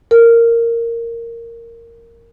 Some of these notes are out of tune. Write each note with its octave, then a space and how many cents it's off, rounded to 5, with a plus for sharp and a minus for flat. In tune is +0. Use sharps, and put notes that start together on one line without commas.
A#4 -10